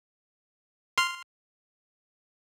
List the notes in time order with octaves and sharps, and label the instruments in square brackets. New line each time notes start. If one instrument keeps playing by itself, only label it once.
[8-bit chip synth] C6 F6